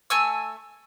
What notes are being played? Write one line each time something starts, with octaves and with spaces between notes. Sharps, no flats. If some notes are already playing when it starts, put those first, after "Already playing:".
A3 G#5 E6